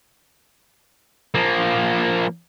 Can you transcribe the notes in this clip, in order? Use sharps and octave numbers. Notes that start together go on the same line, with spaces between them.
F3 A#3